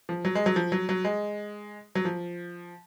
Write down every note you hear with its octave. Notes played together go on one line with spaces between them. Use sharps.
F3
F#3
G#3
F#3
F3
F#3
F#3
G#3
F#3
F3